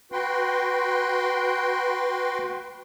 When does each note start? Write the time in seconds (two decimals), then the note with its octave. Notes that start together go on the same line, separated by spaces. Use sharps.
0.12 F#4 B4 G5 C6